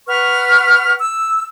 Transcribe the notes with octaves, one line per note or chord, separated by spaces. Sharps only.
B4 F#5 C#6 F6
E6